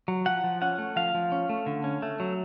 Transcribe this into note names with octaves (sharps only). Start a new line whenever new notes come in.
F#3
F3 F#5
F3
C#4 F#5
A3
F3 F5
F3
C#4
A3
D3
C#4
A3
F#3